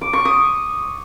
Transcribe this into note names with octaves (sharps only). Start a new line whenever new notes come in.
D6
C#6
D#6